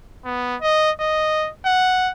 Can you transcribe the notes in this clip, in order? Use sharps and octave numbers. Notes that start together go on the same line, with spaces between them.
B3
D#5
D#5
F#5